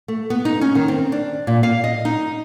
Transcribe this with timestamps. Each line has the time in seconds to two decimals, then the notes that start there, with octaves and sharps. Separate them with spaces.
0.08 A3
0.30 B3
0.45 D#4
0.61 C#4
0.75 D#3
0.88 C4
1.12 D4
1.47 A#2
1.63 F5
1.84 D#5
2.05 D#4